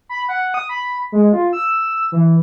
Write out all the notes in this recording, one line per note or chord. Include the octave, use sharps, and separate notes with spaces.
B5
F#5
D#6
B5
G#3
F4
E6
E3